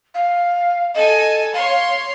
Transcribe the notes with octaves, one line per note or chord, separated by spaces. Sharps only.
F5
A4 D#5 G#5
C#5 F5 C6